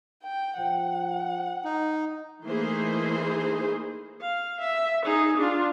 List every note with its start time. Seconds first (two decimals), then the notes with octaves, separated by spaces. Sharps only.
0.23 G5
0.58 F3 F#5 G5
1.64 D#4
2.45 E3 A3 A#3 D#4 G#4 C5
4.21 F5
4.60 E5
5.05 D#4 G#4
5.37 D4 F4